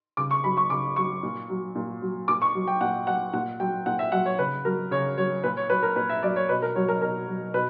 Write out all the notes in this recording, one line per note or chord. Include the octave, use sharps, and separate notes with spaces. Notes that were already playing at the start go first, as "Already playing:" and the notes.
C#3 D6
C#6
F#3 B5
C#6
C#3 D6
F#3 C#6
A#2
F#3
A#2
F#3
A#2 D6
C#6
F#3
G5
A#2 F#5
F#3 F#5
A#2 F#5
F#3 G5
A#2 F#5
E5
F#3 F#5
C#5
C#3 B4
F#3 A#4
C#3 C#5
F#3 C#5
A#2 B4
C#5
F#3 B4
A#4
A#2 B4
E5
F#3 D5
C#5
B2 B4
A#4
F#3 C#5
A#4
B2 A#4
F#3
B2 B4